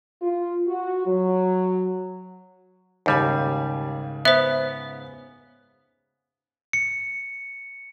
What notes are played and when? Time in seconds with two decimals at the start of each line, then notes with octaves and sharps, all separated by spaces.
0.22 F4
0.68 F#4
1.06 F#3
3.06 D#2 G#2 C#3 G3 G#5
4.25 B3 C5 E5
6.73 C#7